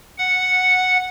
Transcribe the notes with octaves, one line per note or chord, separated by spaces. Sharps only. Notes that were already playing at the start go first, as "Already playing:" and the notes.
F#5